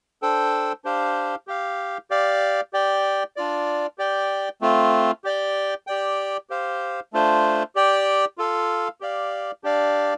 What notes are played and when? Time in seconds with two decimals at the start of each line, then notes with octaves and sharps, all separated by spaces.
0.22 D4 A4 C5 G5
0.84 D4 G4 C5 F5
1.47 G4 F5
2.10 G4 D5 F5
2.73 G4 D5 G5
3.36 D4 F4 D5
3.98 G4 D5 G5
4.61 A3 C4 F4
5.24 G4 D5 G5
5.87 G4 D5 G5
6.50 G4 C5 F5
7.13 A3 D4 F4 C5
7.75 G4 D5 G5
8.38 F4 A4 F5
9.01 G4 D5 F5
9.64 D4 G4 D5 F5